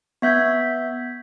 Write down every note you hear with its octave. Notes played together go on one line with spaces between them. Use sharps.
B3 E5 G6 G#6 B6